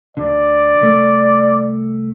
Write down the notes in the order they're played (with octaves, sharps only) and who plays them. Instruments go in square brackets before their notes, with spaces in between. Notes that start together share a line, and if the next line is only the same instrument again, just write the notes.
[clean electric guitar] D2 D3 [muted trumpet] D5
[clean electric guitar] C2 A3